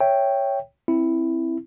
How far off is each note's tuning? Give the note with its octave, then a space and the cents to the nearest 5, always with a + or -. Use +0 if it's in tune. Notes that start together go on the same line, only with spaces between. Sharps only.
C#5 +0 E5 +0 G5 +0
C4 +10 E4 +0